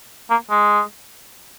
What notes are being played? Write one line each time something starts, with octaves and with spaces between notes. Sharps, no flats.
A#3
G#3